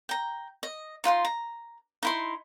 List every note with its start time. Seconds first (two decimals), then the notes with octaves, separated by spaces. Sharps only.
0.09 G5 A#5
0.63 D#5
1.04 D#4 F4 F#5 C6
1.25 A#5
2.03 D#4 E4 C6